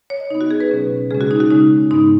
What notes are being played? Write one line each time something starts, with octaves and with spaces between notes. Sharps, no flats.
C#5
D#5
C#3 B3 D#4
F#4
G#4
B4
B2 F#3 C#4
C#3 G#3 C#4 G#4
F#4
D#4
F#4
C#3 G#3 C#4 D#4
G#2 G#3 B3 D#4